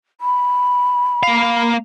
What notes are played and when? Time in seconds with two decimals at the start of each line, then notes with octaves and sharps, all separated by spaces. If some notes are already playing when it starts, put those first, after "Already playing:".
0.21 B5
1.23 A#3 F5